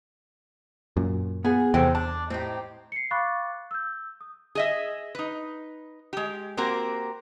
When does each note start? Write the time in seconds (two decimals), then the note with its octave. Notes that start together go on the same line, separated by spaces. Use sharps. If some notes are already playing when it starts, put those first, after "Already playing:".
0.97 F#2 A#2
1.44 B3 F4 G#4 G#5
1.74 E2 C3 F#3 A4 C5 G5
1.95 D4 A5
2.30 A2 C4 D#4 G4
2.92 C7 C#7
3.11 F5 B5 C#6 D6 F#6 A6
3.71 E6 G6
4.21 D#6
4.55 G#4 D#5 E5
5.15 D#4 B4
6.13 G#3 G4
6.57 A#3 C4 F#4 G4 A#4 C5